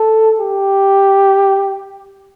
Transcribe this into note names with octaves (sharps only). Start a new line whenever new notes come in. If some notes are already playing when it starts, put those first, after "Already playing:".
Already playing: A4
G4